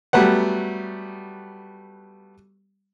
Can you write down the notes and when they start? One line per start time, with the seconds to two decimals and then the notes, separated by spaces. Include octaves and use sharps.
0.13 F#3 G3 A3 B3 F#5